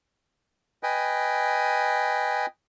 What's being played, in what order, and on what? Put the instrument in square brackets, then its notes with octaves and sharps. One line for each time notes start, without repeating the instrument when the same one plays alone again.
[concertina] B4 D#5 G5 G#5